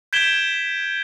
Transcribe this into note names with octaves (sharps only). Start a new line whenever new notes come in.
G6 G#6 B6 D7 E7 G7